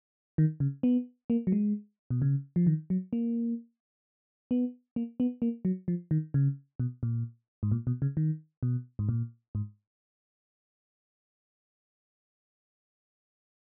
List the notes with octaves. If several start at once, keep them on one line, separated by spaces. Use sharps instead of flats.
D#3
C#3
B3
A#3
F#3
G#3
B2
C#3
F3
D#3
F#3
A#3
B3
A#3
B3
A#3
F#3
F3
D#3
C#3
B2
A#2
G#2
A#2
B2
C#3
D#3
B2
G#2
A#2
G#2